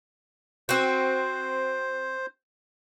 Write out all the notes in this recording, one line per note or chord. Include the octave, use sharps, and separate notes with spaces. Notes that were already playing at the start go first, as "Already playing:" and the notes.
C4 F#4 C5